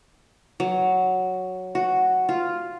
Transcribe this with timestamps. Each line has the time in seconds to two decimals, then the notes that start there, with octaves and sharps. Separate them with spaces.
0.60 F#3
1.75 F#4
2.29 F4